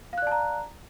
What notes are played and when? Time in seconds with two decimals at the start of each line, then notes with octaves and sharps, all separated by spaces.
0.13 F5
0.18 F#6
0.22 D5
0.27 A5
0.32 A#5